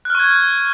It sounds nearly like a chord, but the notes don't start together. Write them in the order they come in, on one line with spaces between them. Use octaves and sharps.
F#6 F6 C#6 G#6